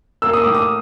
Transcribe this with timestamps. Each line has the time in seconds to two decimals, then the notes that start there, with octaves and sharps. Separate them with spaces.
0.22 A#3 E6
0.33 D#6
0.44 A2 D6
0.55 D#6